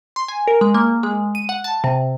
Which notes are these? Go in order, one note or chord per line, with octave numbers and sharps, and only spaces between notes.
C6
G#5
A#4
G#3
A#3
G#3
D#7
F#5
A5
C3